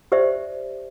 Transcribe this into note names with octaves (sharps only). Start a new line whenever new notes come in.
G4 C5 D5 E5